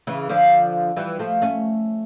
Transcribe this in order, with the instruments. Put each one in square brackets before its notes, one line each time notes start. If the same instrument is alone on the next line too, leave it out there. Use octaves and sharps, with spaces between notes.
[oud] C#3 E3
D3 F3
E3 G3
F3 A3
A3 C#4